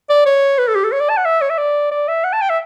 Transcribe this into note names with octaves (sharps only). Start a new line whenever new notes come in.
D5
C#5
B4
A4
G4
A4
C#5
D5
A5
F#5
E5
C#5
E5
D5
D5
E5
F#5
A5
G5
E5